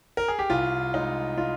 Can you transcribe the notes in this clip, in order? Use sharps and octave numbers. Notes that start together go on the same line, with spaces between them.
A#4
G#4
G4
C2 F4
G#3 D#4
F4